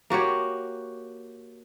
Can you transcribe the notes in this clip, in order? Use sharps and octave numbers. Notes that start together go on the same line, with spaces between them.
A#3 F#4 G4 C#5